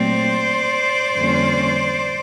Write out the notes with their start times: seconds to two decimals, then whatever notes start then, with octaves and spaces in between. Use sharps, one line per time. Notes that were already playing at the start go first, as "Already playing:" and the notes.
Already playing: A#2 F#3 A3 C4 C5 D5
1.15 F2 D3 G3 A#3 C#4